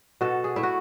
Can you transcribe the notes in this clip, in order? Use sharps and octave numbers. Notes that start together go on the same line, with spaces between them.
B2 F#4 A4
G#4
A3 E4
F#4